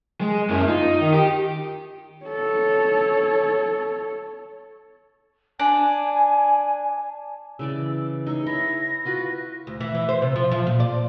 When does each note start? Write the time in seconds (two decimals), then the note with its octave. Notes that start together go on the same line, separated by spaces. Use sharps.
0.21 G#3
0.50 F#2 A#3 E4
0.68 D#4 F4
0.99 D#3
1.13 G4
2.26 A4 C#5
5.59 D4 G#5
7.59 C#3 E3 D5 E6
8.27 D#4 G#4 C#5 E6
8.46 E4 C#5 A#6
9.05 F4 F#4 B4
9.67 D2
9.80 E3
9.95 E3
10.09 C5
10.22 C3
10.36 F3
10.51 F3
10.66 A#2
10.80 D5